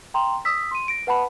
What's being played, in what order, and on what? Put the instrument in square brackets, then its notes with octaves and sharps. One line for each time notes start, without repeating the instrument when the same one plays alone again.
[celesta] G5 A#5 C6
D#6 E6 B6
C6 D#7
A#6 D7
B4 F#5 A5 B5